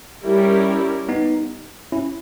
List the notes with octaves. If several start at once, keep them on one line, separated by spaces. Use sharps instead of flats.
G3 C#4 E4 G4 A#4
B3 D#4
C#4 E4